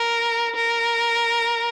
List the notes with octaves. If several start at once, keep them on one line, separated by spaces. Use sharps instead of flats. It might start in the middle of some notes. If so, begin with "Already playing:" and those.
Already playing: A#4
A#4